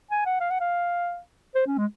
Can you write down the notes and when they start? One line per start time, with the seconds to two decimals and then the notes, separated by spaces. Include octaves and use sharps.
0.11 G#5
0.26 F#5
0.40 F5
0.50 F#5
0.61 F5
1.55 C5
1.67 C#4
1.78 G#3